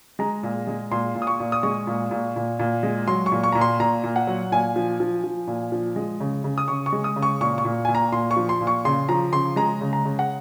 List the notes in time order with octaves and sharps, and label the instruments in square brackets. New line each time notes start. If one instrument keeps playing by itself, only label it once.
[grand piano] G#3 A#5
A#2
G#3
A#2 C6
A#2
D#6
C#6
A#2
D#6
G#3 C#6
A#2
A#2
A#2
A#2
G#3
F#3 C6
C#6
A#2
C#6
A#2 A#5
C6
A#2 A#5
A#2
F#5
F#3
A#2 G#5
F3
F3
F3
A#2
F3
G#3
C#3
C#3
D#6
C#3 C#6
C#6
G#3
D#6
C#3
C#6
A#2 C#6
C#6
A#2
A#2 G#5
A#5
A#2 C6
C#6
F3
C6
A#2
C#6
C#3 C6
F3 A#5
C#3 C6
G#3 A#5
C#3
A#5
C#3
F#5